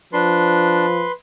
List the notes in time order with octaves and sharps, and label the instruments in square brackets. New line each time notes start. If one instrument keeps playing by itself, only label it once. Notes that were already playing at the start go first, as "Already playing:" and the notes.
[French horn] F3 [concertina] D4 [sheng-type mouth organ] B4 C6